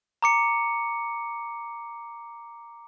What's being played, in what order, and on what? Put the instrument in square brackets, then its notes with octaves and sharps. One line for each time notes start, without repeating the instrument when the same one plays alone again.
[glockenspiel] A#5 D6 C#7